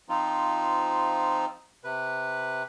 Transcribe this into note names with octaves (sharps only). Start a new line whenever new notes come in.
F3 C4 D#4 F4
C3 B4